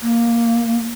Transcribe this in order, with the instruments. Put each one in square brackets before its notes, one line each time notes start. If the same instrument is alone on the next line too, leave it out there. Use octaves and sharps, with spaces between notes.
[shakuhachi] A#3